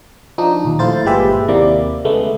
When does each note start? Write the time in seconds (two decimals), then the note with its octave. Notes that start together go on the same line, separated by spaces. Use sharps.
0.38 F3 D4 D#4
0.65 A#1 D#2
0.79 A3 E4 F4 C5 A6
1.05 G1 A#2 G#3 G4 B4 E5
1.48 D#2 C3 A#3 E4 D5
2.04 C#3 G#3 A3 B3